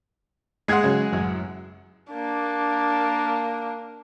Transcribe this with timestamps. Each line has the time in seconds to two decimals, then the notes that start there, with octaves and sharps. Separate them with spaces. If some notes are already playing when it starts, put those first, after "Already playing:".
0.68 G#3 G#4 F#5 C6 G#6 C7
0.83 C#3 F#3 C#4
1.12 A1 F#2
2.13 A#3 D4